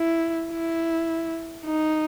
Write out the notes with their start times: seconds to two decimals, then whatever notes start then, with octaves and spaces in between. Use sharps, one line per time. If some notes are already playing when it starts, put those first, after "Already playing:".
Already playing: E4
0.51 E4
1.65 D#4